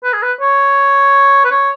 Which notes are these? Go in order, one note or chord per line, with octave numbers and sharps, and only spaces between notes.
B4
G#4
B4
C#5
B4
C#5